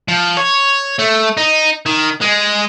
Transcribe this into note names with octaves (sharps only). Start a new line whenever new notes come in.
F3
C#5
A3
D#4
D#3
G#3